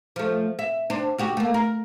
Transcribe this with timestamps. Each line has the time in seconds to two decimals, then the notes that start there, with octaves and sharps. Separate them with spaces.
0.16 F3 A3
0.59 E5
0.90 C4 D4
1.18 D2 F#4 G4
1.37 A3 A#3
1.54 A#4